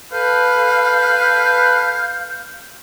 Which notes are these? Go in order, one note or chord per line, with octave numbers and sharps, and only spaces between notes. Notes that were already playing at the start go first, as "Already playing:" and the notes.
A4 B4 F5 G6